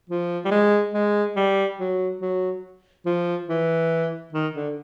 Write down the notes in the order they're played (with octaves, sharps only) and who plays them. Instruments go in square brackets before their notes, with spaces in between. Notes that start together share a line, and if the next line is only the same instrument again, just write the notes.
[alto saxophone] F3
G3
G#3
G#3
G3
F#3
F#3
F3
E3
D#3
D3